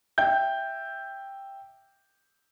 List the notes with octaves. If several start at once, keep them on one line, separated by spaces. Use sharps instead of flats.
E5 G5 G6